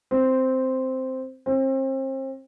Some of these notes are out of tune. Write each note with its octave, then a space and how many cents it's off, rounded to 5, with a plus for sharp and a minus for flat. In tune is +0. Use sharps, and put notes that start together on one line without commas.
C4 -5
C4 +35